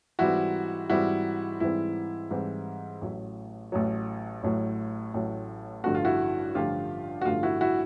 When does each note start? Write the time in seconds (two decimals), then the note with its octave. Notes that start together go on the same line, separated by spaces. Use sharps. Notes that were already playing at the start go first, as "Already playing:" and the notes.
0.19 G#2 E3 G3 C4 E4 F#4
0.89 G#2 E3 G3 C4 E4 F#4
1.60 G#2 E3 G3 C4 E4
2.31 G#2 E3 G3 C4
3.01 A1 A2 F#3
3.72 A1 A2 F#3
4.43 A1 A2 F#3
5.14 A1 A2 F#3
5.84 A1 G2 D3 F3 A3 F#4
5.95 F4
6.05 E4 F#4
6.55 A1 G2 D3 F3 A3 F4 G4
7.21 F#4
7.25 A1 G2 D3 F3 A3 F4
7.43 E4 F#4
7.61 E4 F#4